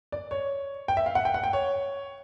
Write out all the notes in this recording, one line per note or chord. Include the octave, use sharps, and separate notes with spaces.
D5
C#5
G5
E5
F5
F#5
G5
F#5
G5
C#5